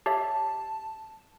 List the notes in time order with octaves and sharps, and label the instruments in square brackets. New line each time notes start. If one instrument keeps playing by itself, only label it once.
[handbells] G4 C#5 E5 [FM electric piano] A5